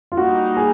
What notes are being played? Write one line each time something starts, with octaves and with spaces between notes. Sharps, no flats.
F4
G3 A#3 D#4 F#4
G#4